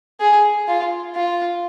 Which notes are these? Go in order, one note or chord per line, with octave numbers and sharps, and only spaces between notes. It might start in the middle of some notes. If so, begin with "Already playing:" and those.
G#4
F4
F4